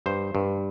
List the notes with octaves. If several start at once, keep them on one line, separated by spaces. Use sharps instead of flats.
G2 C5
G2